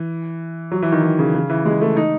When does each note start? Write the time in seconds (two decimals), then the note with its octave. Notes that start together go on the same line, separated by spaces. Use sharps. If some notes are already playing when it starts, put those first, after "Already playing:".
Already playing: E3
0.72 F#3
0.82 E3
0.92 D#3
1.03 D#3
1.19 C#3
1.35 C#3
1.50 E3
1.65 G#3
1.81 A3
1.97 D#4